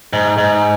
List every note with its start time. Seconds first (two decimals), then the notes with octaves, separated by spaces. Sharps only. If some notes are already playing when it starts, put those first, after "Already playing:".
0.13 G#2
0.38 G#2